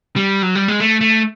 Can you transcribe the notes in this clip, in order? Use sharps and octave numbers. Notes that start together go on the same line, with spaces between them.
G3
F#3
G3
G#3
A3
A3